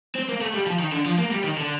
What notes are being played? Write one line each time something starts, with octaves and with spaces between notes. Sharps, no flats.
C4
A#3
A3
G3
F3
D#3
D3
F3
A#3
G3
D#3
D3